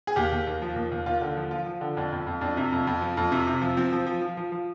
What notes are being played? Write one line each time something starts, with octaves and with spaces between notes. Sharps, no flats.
G#4
D#2 G4
D#2
D#2
F3
D#2
D#2
D#2 F4
D3
F3
F3 F4
F3
D3
F2 D4
F2
F2
F2 D4
C3
F2
F2
F3
F2
C3
C3
F3
F3 C4
F3
F3
F3
F3
F3